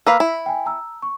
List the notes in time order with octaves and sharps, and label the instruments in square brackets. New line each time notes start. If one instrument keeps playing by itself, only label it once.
[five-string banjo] A#3 B4 F5 [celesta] E6 B6
[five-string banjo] E4
[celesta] G5 G#5
A5 A#5 E6
C#6